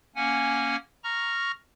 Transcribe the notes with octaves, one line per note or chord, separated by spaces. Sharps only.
A#3 C#4 F#5 G#5
A#5 C#6 F6 A#6